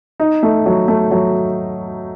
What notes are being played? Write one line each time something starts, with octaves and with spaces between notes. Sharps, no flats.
D#4
A3
F#3
A3
F#3